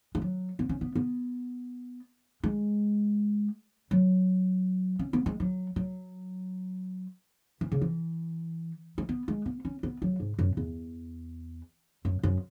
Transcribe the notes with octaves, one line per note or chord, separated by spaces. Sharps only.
G#3
F#3
B3
C#4
B3
B3
G#3
F#3
C#4
B3
G#3
F#3
F#3
E3
C#3
E3
G#3
B3
G#3
B3
C#4
B3
F#3
G#2
F#2
E2
F#2
F#2